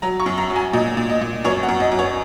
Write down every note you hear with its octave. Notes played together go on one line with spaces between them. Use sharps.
F#3 A#5
C#6
F#2
A#5
F#3
G#5
A#2 D#5
A#2
D#5
A#2
F#2 C#5
F#5
F#2
D#5
F#2
C#5